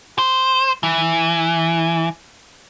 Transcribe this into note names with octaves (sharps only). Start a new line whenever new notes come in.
C5
E3